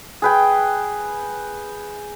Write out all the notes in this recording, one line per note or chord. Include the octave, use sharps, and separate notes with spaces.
G#4 B4 G5